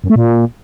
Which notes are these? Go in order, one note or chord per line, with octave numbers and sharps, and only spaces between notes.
F#2
A3
A#2